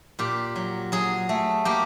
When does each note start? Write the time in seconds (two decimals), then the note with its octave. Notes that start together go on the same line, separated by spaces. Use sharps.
0.19 A#2 G4
0.56 F#3
0.92 F#3 G#4
1.29 A3
1.65 A#3 G4